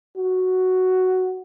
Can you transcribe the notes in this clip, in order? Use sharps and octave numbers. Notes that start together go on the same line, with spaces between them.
F#4